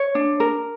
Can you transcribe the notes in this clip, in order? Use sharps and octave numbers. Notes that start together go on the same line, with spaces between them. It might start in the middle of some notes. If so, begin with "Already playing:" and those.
Already playing: C#5
D4
A#4